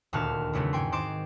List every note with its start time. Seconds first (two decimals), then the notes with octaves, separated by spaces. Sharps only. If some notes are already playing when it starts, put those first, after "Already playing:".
0.13 D#1 D2 A#2 F#4 A5 F6
0.53 E2 C#3 F#3 A3 B3 C4
0.73 G#2 F#4 G5 G#5 C6
0.92 D#3 C4 C5 C6 D6 E7